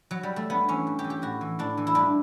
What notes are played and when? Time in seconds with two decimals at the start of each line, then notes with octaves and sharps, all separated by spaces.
0.11 F#3
0.23 G3
0.36 A3
0.50 G2 B3
0.68 E3 C#4
0.87 G2
0.99 G4
1.04 E3
1.10 G4
1.22 A2 F#4
1.41 E3
1.59 A2 D4
1.77 E3
1.87 E4
1.95 G2 D4